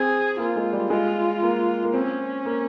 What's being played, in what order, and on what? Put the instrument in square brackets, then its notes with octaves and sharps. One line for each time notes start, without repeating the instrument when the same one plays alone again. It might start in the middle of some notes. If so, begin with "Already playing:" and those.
Already playing: [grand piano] C4 [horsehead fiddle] G#4
[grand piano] A#3 [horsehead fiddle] F4
[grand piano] G#3
G3
[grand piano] G#3 [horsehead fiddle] F4
[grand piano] A#3
A#3
[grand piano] C4 [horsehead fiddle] C#4
[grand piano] A#3